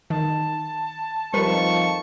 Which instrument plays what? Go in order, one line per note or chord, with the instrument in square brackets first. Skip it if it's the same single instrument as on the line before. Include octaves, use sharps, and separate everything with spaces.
[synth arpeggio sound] D#3 [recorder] A5
[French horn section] F2 D#3 F3 [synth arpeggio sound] G3 A#4 B4 [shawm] C#6